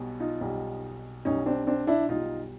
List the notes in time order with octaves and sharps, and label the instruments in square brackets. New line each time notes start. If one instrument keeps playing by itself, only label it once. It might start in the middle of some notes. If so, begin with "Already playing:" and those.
Already playing: [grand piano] B1 B2 G3
[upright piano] D#4 F4
[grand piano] B1 B2 G3
[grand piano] B1 B2 G3 [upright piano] C#4 D#4
[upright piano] C4 D4
C4 D4
D4 E4
[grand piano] B1 B2 G3 [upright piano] D#4 F4